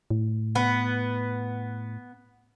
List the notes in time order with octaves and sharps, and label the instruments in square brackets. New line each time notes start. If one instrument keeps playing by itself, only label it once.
[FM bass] A2
[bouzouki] B3